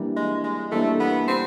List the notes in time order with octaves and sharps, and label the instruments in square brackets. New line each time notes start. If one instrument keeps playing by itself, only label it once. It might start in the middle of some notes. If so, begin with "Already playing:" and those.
Already playing: [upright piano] E3 G3 A#3 D4
[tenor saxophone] G#3
G#3
[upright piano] E3 G3 A#3 D4 [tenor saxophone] A3
[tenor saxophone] B3
C4